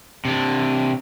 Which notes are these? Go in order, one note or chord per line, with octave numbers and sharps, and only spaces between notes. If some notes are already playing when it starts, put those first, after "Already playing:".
C3 D4